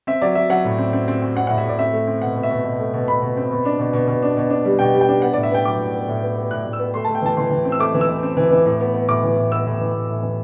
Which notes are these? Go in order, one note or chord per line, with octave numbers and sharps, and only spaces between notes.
C4 E5
F#3 D5
F#3 E5
F#3 F#5
A2
C4
C4
C4
C4
C4 F#5
A2 F#5
E5
A2 D5
C4 E5
A3
C4
B2 F#5
B2
E5
B2
B2
A3
B2
B2 B5
B2
C4
B2
D4
B2
B2
B2
D4
B2
D4
G3
B2 G5
G3
G5
D4
B3 F#5
A2 D5
E5
B3 G5
F#3 D6
A2
B3
A2
B3
B3
A2 F#6
A2
E6
B3
A3 C6
A3 A5
G5
E3 A5
E3 C6
E3
C4
E6
A3 D6
E3
E6
E3
C4
E3
E3
A2
B3
B3
A2 D6
E3
A2
B3 E6
A2
E3
A2
A2
E3